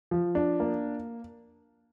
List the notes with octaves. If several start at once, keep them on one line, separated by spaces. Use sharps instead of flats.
F3
D4
A#3